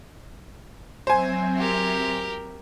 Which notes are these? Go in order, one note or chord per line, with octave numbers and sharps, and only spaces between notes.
F#3 C4 C5 E5 G#5
G4 A#4